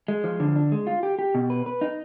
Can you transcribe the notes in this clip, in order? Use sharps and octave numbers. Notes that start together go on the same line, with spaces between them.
G#3
F3
D3
D4
G#3
F4
G4
G4
B2
B4
B4
D#4